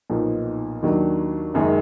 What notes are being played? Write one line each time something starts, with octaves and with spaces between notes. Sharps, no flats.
B1 A#2 F3 B3 D#4
D#2 D#3 F#3 D4
F#1 F#2 D#3 G#3